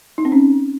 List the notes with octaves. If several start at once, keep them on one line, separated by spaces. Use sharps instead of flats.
D#4
C4
C#4